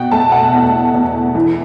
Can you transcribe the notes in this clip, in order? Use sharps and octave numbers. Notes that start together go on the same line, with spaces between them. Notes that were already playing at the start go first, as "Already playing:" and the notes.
Already playing: B2 F#5 G5
A3 A5
F#5
E2
E2
E3